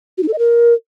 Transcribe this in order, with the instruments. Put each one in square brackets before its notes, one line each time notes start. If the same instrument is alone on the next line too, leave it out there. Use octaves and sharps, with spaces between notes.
[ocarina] F#4
D#4
A4
D#5
A#4